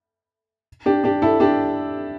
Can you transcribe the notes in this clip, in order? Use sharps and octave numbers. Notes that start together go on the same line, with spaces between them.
D4 G4
D4 G4
E4 A4
D4 G4